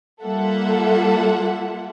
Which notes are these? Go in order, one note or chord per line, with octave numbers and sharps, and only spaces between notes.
G3 A#3 F4 A4 E5 F#5